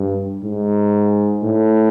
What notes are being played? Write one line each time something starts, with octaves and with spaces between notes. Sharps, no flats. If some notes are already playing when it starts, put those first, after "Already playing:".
Already playing: G2
G#2
A2